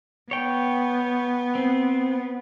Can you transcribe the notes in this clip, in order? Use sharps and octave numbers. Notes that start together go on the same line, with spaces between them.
B3 C#5 G5
C4